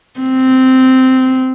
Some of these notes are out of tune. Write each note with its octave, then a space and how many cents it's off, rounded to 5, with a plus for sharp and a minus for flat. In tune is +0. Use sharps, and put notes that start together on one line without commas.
C4 -10